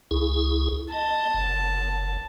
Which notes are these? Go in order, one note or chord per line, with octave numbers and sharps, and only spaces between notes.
C#2 E4 G#4
D#5 A5
F#1